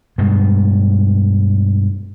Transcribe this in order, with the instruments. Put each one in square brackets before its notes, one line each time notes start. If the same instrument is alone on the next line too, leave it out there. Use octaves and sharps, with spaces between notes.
[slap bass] G2 B2 G#3